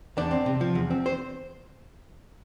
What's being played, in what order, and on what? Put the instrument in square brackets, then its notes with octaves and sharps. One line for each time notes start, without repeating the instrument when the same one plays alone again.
[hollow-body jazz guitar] E2 D4
C4
C3
F3
E2
C4
C5